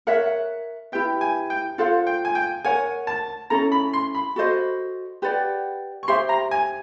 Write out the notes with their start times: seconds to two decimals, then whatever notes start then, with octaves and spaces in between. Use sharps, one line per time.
0.07 A#4 C#5 E5 F#5
0.92 E4 G4 B4 E5 G5
1.21 G#5
1.50 G5
1.78 F4 A4 C5 F5 F#5
2.07 G5
2.25 G#5
2.35 G5
2.64 A#4 C#5 F#5 G#5
3.07 A5
3.50 C#4 E4 A4 A#5
3.72 B5
3.93 C6
4.15 B5
4.36 F#4 A4 C5 D#5
5.22 G4 B4 D5 F#5
6.03 C#6
6.08 G4 C5 E5 G5 C6
6.29 A#5
6.51 G#5